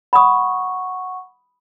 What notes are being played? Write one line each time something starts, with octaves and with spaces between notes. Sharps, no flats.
F#5 B5 C#6 D#6